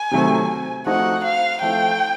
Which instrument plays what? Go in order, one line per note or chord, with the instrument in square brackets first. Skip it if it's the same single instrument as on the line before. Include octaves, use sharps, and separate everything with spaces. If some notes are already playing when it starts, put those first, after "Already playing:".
Already playing: [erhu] G#5
[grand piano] C3 D#3 F#3 A3 C4
[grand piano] F3 A3 C4 D#4 F#4 [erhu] F#5
[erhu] F5
[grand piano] F3 A3 C4 E4 A4 [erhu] G5